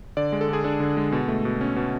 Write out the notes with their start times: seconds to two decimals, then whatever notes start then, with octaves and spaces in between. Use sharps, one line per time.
0.17 D3 D5
0.32 G#3
0.41 A4
0.49 D3 G#4
0.64 D4 A4
0.80 D3
0.97 G#3
1.12 B2
1.28 A3
1.45 B2
1.61 C#4
1.76 B2